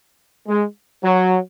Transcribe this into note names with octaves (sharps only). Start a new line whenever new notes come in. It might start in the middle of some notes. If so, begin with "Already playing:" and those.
G#3
F#3